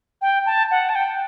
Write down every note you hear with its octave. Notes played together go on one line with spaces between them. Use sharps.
G5
A5
F#5
A5
G5